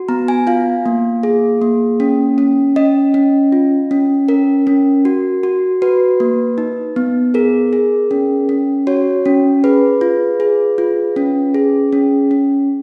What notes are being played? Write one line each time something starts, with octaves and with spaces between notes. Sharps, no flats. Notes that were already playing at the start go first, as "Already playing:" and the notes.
Already playing: F#4
B3 A#5
G#5
F4 F5
A#3
G#4
A#3
C#4
C#4
C#4 D#5
C#4
F4
C#4
C#4 A#4
C#4
F#4
F#4
F#4 B4
A#3
D#4
B3
G#4 A#4
G#4
C#4
C#4
F#4 C#5
C#4
G#4 B4
F4
G#4
F4
C#4
G#4
C#4
C#4